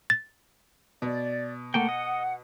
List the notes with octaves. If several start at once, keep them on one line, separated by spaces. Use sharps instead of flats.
A6
B2 D5
A3 A#3 F#5 G5
D#5